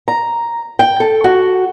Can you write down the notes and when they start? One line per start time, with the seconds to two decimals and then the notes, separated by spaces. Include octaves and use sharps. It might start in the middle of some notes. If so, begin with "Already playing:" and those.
0.08 A#5
0.79 G5
1.00 A4
1.24 F#4